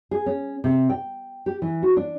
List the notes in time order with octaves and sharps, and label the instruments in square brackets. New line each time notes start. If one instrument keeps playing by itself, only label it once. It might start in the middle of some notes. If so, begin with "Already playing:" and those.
[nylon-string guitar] G#4
C#4
C3
G5
G4
E3
F#4
D4